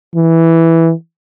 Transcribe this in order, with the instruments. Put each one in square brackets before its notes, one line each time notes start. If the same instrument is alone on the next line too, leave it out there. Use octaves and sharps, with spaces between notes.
[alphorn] E3